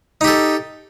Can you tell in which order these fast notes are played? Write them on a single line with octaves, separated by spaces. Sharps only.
D#4 G4 A4